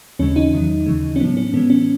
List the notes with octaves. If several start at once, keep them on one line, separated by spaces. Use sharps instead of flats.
D#2 C#3 E3 G#3 C#4
D#4
E2 D#3 F#3
D#2 C#3 E3 G#3
C#4
A2 F#3 B3
C#4
A2 E3 G#3 B3
C#4